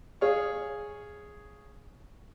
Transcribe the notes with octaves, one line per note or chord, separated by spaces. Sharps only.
G#4 C#5 F5 C#6